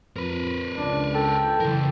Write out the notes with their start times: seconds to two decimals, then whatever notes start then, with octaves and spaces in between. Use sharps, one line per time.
0.16 F2 A#4 B4
0.77 C#2 D4
1.14 A4 G5
1.60 C#3 E3 A#4